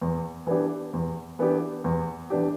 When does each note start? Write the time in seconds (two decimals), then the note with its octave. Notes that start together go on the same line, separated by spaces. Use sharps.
0.02 E2
0.47 E3 B3 D4 G4
0.93 E2
1.39 E3 B3 D4 G4
1.84 E2
2.30 E3 B3 D4 G4